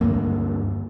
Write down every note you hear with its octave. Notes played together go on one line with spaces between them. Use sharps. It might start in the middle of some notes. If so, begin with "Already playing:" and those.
D2 G2 G#3 A#3